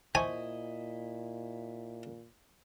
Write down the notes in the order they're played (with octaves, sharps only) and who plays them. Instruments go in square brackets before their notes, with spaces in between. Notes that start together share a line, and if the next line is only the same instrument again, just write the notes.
[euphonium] A#2 [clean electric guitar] E4 D#5 [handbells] C5 E5 C#6 [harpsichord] G#5